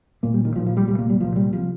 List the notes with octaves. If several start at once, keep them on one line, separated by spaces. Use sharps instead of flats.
A#1 A#2 A#3
G3
D#3
A#1 A#2 F3
F3
G3
C2 A#2 G3
A#3
G3
C2 A#2 F3
G3
C3 F3